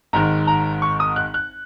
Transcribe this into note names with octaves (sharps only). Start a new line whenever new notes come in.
G#1 G#2 D#3 A#5
A#5
C#6
D#6
F#6
F#6